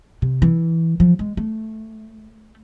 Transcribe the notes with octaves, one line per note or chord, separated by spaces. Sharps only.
C3
E3
F3
G#3
A3